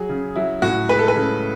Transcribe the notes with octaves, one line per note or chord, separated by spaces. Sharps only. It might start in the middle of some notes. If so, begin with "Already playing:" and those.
Already playing: F#3 G#4
C#3
F#3 E4
A2 F#4
G#3 B4
A4
B4
C#3